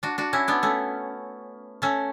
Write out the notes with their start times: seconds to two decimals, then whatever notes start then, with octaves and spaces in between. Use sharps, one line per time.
0.03 D4 F#4
0.18 D4 F#4
0.33 C#4 E4
0.48 B3 D4
0.63 A3 C#4
1.82 A3 C#4